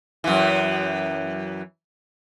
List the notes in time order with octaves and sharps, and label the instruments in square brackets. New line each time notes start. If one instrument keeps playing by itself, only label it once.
[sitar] F#2 E3